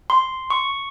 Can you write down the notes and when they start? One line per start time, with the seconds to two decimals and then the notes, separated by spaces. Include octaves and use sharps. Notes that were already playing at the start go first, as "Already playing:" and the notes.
0.10 C6
0.50 C#6